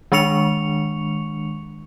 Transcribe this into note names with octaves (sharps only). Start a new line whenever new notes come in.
D#3 G#3 D4 C#6 C#7 F7